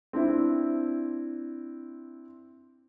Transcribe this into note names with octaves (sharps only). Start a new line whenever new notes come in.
C4 D4 E4